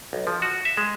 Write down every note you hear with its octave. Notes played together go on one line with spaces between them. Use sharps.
B1
F3
F#4
E5
G#3